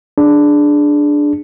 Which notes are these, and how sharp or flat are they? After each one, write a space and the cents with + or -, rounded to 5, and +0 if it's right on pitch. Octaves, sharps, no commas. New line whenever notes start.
D4 +0 G#4 +10